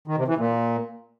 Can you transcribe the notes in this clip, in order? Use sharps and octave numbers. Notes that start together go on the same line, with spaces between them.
D#3
C3
E3
A#2